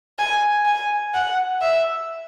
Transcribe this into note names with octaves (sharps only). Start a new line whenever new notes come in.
G#5
G#5
F#5
E5